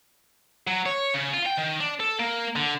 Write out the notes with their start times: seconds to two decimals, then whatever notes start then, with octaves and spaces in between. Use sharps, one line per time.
0.67 F#3
0.86 C#5
1.14 C#3
1.34 F4
1.46 G5
1.58 D#3
1.80 D4
2.00 A4
2.19 A#3
2.56 D3